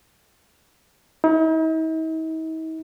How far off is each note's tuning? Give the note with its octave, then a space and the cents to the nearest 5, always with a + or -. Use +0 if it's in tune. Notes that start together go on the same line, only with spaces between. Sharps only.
D#4 +45